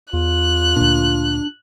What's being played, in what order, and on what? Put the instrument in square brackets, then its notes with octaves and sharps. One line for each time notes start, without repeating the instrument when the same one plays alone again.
[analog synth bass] E2 [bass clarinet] F4 [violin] F#6
[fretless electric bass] D2 A#2 [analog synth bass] D4